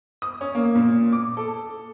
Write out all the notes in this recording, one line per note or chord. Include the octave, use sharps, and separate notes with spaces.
D#6
C#4
A#3
A#2
D6
A4